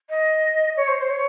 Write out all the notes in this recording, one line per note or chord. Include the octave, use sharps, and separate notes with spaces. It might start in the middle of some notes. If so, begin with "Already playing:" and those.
D#5
C#5
C5
C5
C#5